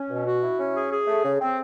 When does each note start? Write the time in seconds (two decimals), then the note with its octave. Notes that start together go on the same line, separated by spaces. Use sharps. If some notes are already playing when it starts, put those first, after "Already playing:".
Already playing: C#4
0.10 B2
0.26 F#4
0.42 E4
0.59 C#4
0.75 G#4
0.92 G#4
1.08 A3
1.25 C#3
1.41 C4